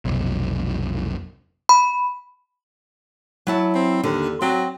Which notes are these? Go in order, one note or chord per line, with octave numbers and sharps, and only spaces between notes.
F1 B1
B5
F#3 E4 A5
C4
D#2 D3
F#3 C4